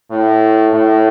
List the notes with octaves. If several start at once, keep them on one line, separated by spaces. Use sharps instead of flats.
A2
A2